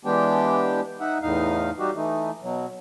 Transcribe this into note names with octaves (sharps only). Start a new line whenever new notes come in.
E3 G#3 B3 D4 G4 G5
D#4 E5 F#5
E2 A2 D#4 F5
G3 D#4 F#4 G4
E3 A3 D#4
B2 F#3